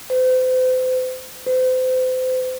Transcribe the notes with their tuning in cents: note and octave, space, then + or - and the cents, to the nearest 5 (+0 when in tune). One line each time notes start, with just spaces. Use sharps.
C5 -40
C5 -35